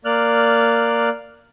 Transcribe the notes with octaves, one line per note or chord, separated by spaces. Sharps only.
A#3 D5 F6 F#6